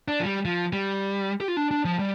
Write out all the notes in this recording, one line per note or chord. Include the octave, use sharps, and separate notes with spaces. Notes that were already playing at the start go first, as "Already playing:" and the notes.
D4
F3
G3
F3
G3
G4
F4
D4
D4
F3
G3